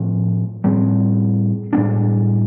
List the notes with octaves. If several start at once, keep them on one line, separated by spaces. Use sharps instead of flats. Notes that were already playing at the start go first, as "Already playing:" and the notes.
Already playing: A2 F3 C4
A2 G3 C4
A2 G3 B3 D4